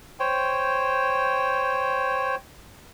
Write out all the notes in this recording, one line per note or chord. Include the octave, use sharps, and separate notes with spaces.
C5 C#5 G5